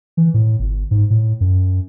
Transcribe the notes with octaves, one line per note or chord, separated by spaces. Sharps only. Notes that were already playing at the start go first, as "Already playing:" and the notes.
E3
A2
G1
G#2
A2
F#2